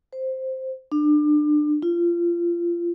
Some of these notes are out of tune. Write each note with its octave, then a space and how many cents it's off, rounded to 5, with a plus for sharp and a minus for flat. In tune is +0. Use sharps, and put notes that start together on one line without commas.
C5 +0
D4 +30
F4 -25